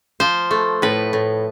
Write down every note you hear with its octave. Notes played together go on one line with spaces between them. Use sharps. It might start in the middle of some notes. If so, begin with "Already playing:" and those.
F3 C5
A3
A2 B4
A2